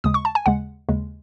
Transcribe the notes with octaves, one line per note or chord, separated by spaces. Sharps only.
D#2 C#3 G#3 D#6
C#6
A5
G#5
D#2 C#3 G#3 F#5
D#2 C#3 G#3